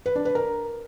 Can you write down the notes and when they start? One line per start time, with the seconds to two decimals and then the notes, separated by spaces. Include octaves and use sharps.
0.06 B4
0.15 D4
0.25 B4
0.35 A#4